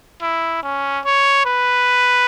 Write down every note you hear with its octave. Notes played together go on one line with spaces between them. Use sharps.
E4
C#4
C#5
B4